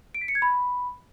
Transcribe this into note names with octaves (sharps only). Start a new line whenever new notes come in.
D7
B6
C#7
G#6
B5